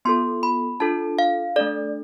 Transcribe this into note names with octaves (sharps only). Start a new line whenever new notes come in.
B3 F4 A4 C6
B5
D4 F4 A4 A5
F5
A3 D4 A4 D5